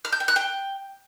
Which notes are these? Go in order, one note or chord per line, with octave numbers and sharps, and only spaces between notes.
F6
G6
G5
F#6
G5